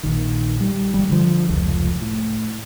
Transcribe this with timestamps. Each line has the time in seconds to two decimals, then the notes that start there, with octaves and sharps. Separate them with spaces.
0.03 A#1 D#3
0.60 G3
0.94 G1 G3
1.09 D3 F3
1.49 F1 C#2 F3
2.01 A2